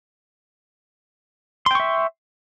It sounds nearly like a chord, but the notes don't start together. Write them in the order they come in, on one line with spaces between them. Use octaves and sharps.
C6 G5 C#6 E5